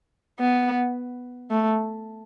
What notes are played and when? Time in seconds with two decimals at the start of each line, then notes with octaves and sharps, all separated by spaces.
0.40 B3
1.51 A3